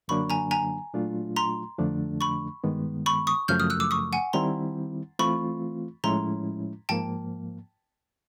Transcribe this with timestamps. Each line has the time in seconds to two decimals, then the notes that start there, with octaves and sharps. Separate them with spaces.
0.08 F#2 D3 F#3 A#3 D4 B5 C#6
0.30 G#5 A#5
0.51 G#5 A#5
0.94 A#2 F#3 A3 D4 F4
1.36 A#5 C6
1.78 F2 D3 F3 A3 D4
2.21 B5 C#6
2.64 G2 D#3 G#3 B3
3.06 B5 C#6
3.27 C#6 D#6
3.48 F#2 C#3 F3 A3 F6 G6
3.60 D#6 F6
3.70 E6 F#6
3.80 D6 E6
3.91 C#6 D#6
4.13 F#5 G#5
4.33 D#3 G3 C4 E4 A#5 C6
5.19 E3 A3 C4 F4 B5 C#6
6.04 A2 F3 G#3 C#4 E4 A#5 C6
6.89 G#2 F3 A#3 G5 A5